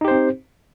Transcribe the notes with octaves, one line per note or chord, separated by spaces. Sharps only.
C4 D#4 G4 C5